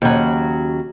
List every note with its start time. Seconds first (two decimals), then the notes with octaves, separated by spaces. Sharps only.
0.02 D#2 C#3 F#3